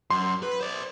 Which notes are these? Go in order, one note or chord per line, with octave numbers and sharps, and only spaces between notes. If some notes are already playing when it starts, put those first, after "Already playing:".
F#2 C6
B4
C5 D5